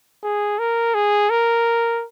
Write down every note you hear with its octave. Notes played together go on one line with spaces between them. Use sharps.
G#4
A#4
G#4
A#4